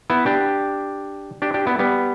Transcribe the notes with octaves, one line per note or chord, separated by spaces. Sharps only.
B3 E4
D4 G4
D4 G4
D4 G4
B3 E4
G3 B3